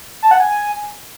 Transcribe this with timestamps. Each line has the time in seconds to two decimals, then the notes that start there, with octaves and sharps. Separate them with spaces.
0.23 A5
0.31 F#5
0.40 G#5